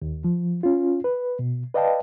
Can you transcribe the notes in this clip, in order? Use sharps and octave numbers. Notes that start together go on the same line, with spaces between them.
D#2
F3
C#4 F4
B4
B2
B4 D5 D#5 F5 G5 A5